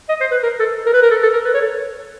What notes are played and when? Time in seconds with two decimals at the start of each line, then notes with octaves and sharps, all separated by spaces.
0.09 D#5
0.21 C5
0.31 B4
0.43 A#4
0.60 A4
0.86 A#4
0.93 B4
1.02 A#4
1.11 A4
1.23 A4
1.33 A#4
1.45 B4
1.54 C#5
1.61 A4